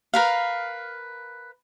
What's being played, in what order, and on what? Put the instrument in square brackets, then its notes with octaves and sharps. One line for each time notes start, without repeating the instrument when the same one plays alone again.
[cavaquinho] A#4 B4 F5